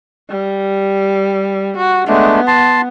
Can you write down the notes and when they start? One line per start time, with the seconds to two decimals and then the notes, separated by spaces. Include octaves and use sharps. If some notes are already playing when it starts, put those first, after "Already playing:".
0.30 G3
1.77 F#4
2.08 G#3 A3 B3 D4
2.47 A5 C6